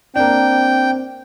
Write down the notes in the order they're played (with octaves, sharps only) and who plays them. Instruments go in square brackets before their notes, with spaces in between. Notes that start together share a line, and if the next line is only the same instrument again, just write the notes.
[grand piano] A#3 D4 [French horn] C4 [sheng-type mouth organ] G5